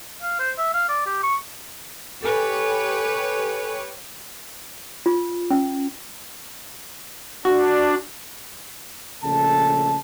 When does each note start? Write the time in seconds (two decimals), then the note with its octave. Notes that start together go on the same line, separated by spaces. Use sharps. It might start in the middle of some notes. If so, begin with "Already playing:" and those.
0.22 F5
0.39 C5
0.58 E5
0.74 F5
0.89 D5
1.07 G4
1.23 C#6
2.23 G4 A4 B4 C#5 G#5
5.06 F4
5.51 C#4
7.45 D4 F#4
9.23 A#1 C#3 A3 A4 A5